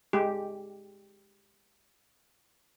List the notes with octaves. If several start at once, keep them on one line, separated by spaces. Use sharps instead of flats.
G#3 G4